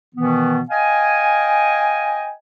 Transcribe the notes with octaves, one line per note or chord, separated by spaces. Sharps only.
B2 D#3 E3 B3
D#5 F5 G5 G#5